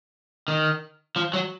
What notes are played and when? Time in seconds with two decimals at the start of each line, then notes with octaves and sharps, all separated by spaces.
0.48 D#3
1.16 F3
1.34 F#3